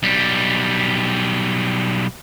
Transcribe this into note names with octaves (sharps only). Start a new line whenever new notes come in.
B1 G3